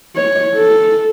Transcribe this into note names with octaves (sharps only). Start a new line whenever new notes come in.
C#5
A4